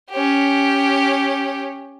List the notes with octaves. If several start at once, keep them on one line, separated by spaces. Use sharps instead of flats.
C#4 G4